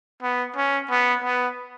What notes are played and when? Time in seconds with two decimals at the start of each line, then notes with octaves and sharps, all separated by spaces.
0.23 B3
0.56 C#4
0.90 B3
1.24 B3